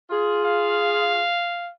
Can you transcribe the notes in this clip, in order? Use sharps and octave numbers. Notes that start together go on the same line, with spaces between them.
F4 G#4
F5